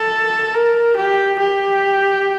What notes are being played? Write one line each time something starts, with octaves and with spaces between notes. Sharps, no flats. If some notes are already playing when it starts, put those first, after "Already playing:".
Already playing: A4
A#4
G4
G4